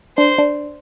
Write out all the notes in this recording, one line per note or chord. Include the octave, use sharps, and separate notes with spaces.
D4 C5
D4